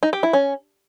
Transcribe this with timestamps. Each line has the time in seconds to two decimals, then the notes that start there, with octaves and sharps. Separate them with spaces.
0.03 D#4
0.13 G4
0.23 E4
0.33 C#4